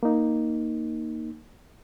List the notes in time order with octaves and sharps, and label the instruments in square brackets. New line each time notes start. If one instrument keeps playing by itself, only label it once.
[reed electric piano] A#3 D#4